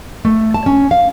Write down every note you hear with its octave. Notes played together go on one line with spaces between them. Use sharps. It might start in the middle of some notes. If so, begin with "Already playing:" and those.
A3
A5
C#4
F5